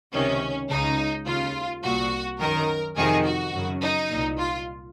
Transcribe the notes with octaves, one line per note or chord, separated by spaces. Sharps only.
C#2 C3 D#3 C#4
C#2 C#3 D#4
D#2 C#3 F4
C2 A#2 F#4
F#2 D#3 A#4
F2 C3 D#3 G#4
F#4
F#2 C#3
D#4
C2 A#2
F4